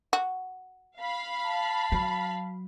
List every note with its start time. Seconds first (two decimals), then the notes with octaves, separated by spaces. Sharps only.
0.13 F#4
0.98 F5 B5
1.45 A5
1.92 F#3